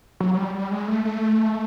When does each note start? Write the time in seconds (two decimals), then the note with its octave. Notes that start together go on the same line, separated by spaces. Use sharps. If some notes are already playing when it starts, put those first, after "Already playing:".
0.20 F#3
0.33 F#3
0.37 G3
0.54 G3
0.71 G#3
0.88 A3
1.05 A3